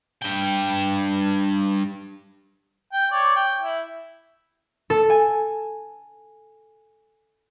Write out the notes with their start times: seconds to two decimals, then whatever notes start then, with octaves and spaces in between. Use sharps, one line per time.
0.22 G2 G5
2.93 G5
3.12 C#5 D5
3.36 G5
3.61 E4
4.90 A4
5.10 G#5